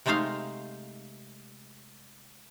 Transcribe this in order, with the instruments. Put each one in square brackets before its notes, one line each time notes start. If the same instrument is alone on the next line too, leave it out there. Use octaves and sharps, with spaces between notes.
[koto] C3 G#3 A3 D#4 C5 F5